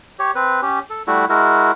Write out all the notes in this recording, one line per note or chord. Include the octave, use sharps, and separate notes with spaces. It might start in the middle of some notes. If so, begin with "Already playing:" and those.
G4 C#5
C4 B4
C#4 G4
A4
G3 A3 E4 F#4
G#3 E4 F#4 A#4